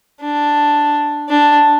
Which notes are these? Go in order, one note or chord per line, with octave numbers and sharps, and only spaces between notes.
D4
D4